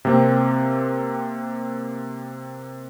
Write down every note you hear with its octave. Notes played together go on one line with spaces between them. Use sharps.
C3 A#3 C4